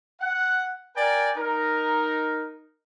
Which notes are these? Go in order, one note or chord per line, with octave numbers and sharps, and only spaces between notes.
F#5
A#4 D5 G5 G#5
D#4 A#4